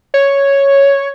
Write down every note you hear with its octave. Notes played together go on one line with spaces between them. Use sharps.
C#5